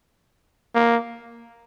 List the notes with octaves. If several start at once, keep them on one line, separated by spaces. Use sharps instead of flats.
A#3